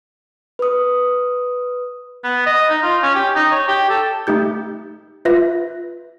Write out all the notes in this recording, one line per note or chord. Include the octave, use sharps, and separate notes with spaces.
B4 D#6
B3
D#5
D#4
F4
C#4
G4
D#4
C#5
G4
A4
A3 D#4 G4 G6
F4 B4 E5 A#6